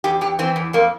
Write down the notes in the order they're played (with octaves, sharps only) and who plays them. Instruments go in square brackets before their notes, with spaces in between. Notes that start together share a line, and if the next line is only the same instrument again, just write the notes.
[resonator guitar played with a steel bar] E2 G4
E2 G4
E3 C4
E2
F2 A#3